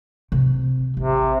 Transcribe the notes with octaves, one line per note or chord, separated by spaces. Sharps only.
C3
A1 C3